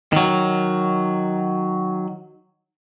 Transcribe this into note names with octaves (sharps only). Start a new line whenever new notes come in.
D#3 F#3